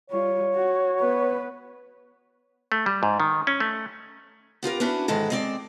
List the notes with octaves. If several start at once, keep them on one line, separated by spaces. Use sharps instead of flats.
G3 F4 C#5
F#4
B3 B4
A3
G3
G#2
D#3
C#4
A3
B3 F4 G4 A#4
B3 C#4 D4 E4 F#4
G#2 D#3 E3 G#3 A4
G#3 C4 D5